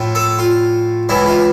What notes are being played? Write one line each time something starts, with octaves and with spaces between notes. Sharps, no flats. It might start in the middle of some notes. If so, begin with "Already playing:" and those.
Already playing: A2 F3 A3
A4
F4
C#2 C#3 E3 E4
F4